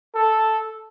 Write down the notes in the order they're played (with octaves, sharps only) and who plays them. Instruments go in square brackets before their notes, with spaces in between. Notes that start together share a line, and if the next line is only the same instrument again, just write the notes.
[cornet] A4